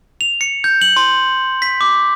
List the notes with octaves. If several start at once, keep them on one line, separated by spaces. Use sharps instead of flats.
F7
C#7
G6
F#7
C6
B6
D6